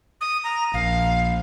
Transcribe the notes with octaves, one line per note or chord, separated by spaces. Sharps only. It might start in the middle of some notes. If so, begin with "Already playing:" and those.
D#6
A#5
A#1 F5